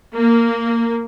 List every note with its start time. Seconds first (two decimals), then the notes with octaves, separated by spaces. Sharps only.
0.15 A#3